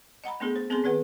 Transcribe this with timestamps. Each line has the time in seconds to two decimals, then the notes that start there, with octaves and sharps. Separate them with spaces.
0.24 D#5 F#5 A#5 B5
0.40 A3 B3 D4 G#4 A4
0.56 C5
0.70 B3 C4 G#4 A4 G#5 C6
0.84 D#3 G#4 B4 F#5